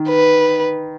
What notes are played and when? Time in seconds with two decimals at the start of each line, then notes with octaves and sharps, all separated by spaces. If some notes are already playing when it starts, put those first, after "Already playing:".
Already playing: D#3
0.09 B4